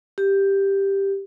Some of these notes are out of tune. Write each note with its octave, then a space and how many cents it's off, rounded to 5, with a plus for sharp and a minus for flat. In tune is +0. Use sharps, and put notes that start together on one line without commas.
G4 +5